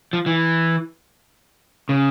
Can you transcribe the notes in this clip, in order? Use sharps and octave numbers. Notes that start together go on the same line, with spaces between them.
F3
E3
C#3